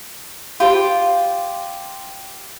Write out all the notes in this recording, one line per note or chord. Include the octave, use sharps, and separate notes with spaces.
F4 G4 C5